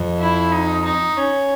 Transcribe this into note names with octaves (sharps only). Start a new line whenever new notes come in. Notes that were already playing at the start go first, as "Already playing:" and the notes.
Already playing: F2
E4
D#4
D#4
C#4